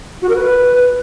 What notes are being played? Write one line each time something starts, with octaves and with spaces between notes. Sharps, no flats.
F#4
A#4
B4